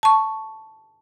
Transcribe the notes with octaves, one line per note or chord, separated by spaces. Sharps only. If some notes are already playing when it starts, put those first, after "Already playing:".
A5 C#6